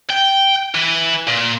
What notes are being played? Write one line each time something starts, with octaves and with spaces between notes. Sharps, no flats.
G5
E3
A#2